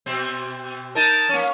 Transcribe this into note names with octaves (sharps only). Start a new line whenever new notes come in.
B2 C4
D#4 A#4 A5
A#3 C#4